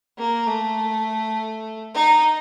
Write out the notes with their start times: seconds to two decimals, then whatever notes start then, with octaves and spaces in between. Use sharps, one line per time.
0.18 A#3
0.47 A3
1.94 D#4